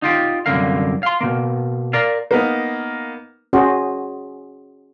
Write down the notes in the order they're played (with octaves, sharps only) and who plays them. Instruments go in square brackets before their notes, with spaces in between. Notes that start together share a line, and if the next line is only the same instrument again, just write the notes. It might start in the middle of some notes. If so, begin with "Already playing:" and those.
[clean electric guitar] D#4 F4 G4
C2 F#2 D3 A#3 F5
F5 C6
B2 A#3
A#4 D5 F5
[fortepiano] A#3 B3 D#4
[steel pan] C#4 F#4 G#4 C5 D#5